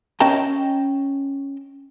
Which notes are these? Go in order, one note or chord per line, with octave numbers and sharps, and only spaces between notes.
C#4 D#5 G5 A5 A#5